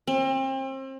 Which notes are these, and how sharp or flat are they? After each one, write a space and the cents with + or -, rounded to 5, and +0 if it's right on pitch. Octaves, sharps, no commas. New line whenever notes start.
C4 +35